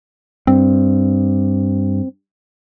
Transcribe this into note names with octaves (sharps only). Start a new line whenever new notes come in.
G2 C4